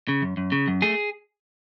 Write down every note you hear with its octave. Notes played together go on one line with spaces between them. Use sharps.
C#3
F#2
F#2
C#3
F#2
A3 G#4